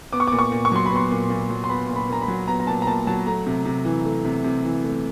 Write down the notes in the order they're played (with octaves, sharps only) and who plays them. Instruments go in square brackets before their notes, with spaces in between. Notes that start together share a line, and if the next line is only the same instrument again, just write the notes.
[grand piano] B3 D6
C#6
D6
A#2
C#6
A#2
C#6
F#3 C6
B5
B3 C6
A#2
A#2
F#3
C6
B3 B5
A#2
B5
A#2 A#5
B5
F#3
B3 A#5
A#5
A#2 A5
A#5
A#2 A5
F#3 A5
A3 A#5
C3
C3
E3
A3
C3
C3
E3
A3